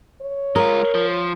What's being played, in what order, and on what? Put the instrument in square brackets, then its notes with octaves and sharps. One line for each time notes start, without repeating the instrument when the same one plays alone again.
[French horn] C#5
[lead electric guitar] G#3 F4 [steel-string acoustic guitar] A#4
[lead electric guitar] F3